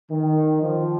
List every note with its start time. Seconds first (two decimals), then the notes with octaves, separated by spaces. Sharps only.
0.10 D#3
0.61 F3